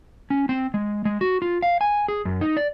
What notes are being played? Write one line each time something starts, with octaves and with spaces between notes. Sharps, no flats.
C#4
C4
G#3
G#3
F#4
F4
F5
G#5
G#4
F#2
D#4
D5